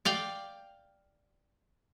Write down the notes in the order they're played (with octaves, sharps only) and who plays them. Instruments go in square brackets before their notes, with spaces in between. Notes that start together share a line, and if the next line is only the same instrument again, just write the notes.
[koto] D5 F5 G5